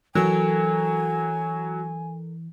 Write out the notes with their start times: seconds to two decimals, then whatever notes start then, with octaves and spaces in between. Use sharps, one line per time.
0.15 E3 F#3 A4 A#4 G#5